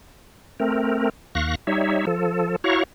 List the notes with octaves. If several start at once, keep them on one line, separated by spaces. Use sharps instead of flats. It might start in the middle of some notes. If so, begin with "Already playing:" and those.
A3 C4 A#4
D#2 F5 C#6 F#6 A#6
G3 D#4 C#5 E5
F3 A4
E4 F#4 C#5 F5 A#5 C#6